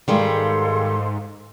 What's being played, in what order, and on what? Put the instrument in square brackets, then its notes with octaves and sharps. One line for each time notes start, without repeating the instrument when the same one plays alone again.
[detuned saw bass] G#2 [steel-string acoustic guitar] D#3 G3 G#3 [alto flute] A4 [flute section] F5 C6